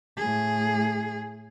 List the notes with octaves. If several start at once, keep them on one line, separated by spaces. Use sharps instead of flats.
A2 G#4